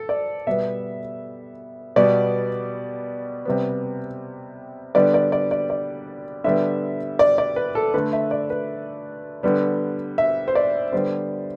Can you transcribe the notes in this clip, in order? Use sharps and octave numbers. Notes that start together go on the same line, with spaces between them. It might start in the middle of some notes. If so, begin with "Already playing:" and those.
Already playing: A4
D5
B2 G3 B3 E5
B2 G3 B3 D5
C3 G3 B3
D3 G3 B3 D5
D5
D5
D5
D5
D3 G3 B3 E5
D5
D5
B4
A4
D3 A3 B4
E5
D5
B4
D3 G3 B3
E5
C5
D5
D3 G3 B3 C5